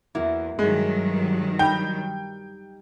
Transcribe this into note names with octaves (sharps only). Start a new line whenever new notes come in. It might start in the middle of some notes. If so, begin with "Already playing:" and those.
E2 A#3 E4 F#4
G2 D#3 F#3 G#3
G3 D#4 G5